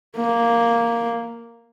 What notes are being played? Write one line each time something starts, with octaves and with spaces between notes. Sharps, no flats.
A#3